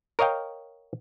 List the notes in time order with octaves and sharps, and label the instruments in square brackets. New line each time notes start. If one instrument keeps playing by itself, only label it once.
[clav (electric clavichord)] A#4 C#5 D#5 F5 G5